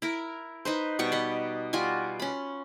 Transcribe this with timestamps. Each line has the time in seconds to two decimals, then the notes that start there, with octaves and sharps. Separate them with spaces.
0.02 E4 A#4
0.65 D#4 B4 C5
0.99 B2 G3 C#6
1.12 B4 D#5
1.73 G3 F4 F#4 G#5
2.20 C#4 B5